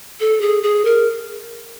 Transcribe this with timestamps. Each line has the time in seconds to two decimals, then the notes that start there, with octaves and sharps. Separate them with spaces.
0.20 A4
0.41 G#4
0.63 G#4
0.85 A#4